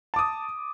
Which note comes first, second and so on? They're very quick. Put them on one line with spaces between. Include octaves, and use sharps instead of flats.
A5 D6 D#6